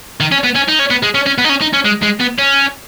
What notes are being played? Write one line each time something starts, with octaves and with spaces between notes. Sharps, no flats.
D#3
C#4
B3
C#4
D#4
C#4
B3
G#3
C#4
C#4
B3
D#4
C#4
D#4
C#4
G#3
G#3
B3
C#4